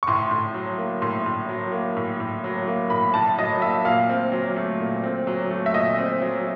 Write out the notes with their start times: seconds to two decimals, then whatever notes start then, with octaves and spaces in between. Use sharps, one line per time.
0.03 C#6
0.08 A2 C6
0.31 A2
0.54 F#3
0.78 A#3
1.02 A2 C6
1.26 A2
1.49 F#3
1.72 A#3
1.97 A2
2.20 A2
2.44 F#3
2.67 A#3
2.90 A2 B5
3.14 A2 A5
3.38 F#3 D#5
3.62 A#3 E5
3.85 A#2 F5
4.09 C4
4.32 F#3
4.56 A3
4.80 A#2
5.04 C4
5.27 F#3
5.50 A3
5.66 E5
5.74 A#2 D#5
5.98 C4
6.22 F#3